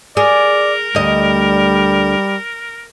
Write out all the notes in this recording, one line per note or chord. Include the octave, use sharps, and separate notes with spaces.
G#4 A#4 D5
D2 G3 D#5